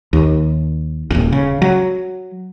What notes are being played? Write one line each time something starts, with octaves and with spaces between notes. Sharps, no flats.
D#2
D#1 G#1
C#3
F#3